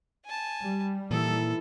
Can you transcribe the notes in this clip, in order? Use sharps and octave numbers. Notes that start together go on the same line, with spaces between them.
G#5 A5
G3
A#2 E3 D#4 E4 A4